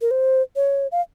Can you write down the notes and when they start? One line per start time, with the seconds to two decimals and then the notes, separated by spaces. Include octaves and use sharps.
0.01 A#4
0.11 C5
0.56 C#5
0.92 F5